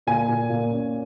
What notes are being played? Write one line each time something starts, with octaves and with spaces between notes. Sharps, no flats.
A#2 G#5
A#2
A#2
C#4